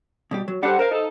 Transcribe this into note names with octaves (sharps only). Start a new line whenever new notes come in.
B2 G3 G4
F#3
G3 D4 A4 C5 F#5
A#4 C5 F5
D#4 A4